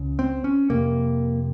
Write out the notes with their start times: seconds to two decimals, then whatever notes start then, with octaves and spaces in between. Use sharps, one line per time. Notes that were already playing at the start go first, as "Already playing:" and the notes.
Already playing: C#2 C#3
0.19 C4
0.44 C#4
0.70 F2 C3 A#3